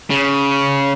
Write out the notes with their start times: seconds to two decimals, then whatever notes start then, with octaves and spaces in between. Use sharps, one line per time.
0.10 C#3